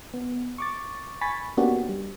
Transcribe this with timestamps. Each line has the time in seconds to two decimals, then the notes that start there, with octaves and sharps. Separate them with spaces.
0.14 B3
0.58 C#6 D6 A6
1.21 G#5 B5 C#6 A6 B6
1.57 A#3 B3 C#4 D4 F#4 G4
1.89 G3